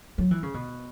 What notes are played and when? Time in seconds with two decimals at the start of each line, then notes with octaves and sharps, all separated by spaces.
0.18 F#3
0.31 E3
0.43 C#3
0.54 B2